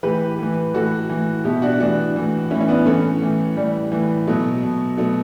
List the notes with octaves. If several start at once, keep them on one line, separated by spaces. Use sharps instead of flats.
A2 E3 G4 B4
A2 E3
A2 E3 F#4 A4
A2 E3
B2 E4 G4
D4 F#4
A2 E3 D4 F#4
A2 E3
A2 E3 C#4 E4
C#4
B3 D4
A2 E3 A3 C#4
A2 E3
A2 E3 G3
A2 E3
B2 F#3 A3
B2
B2 F#3 A3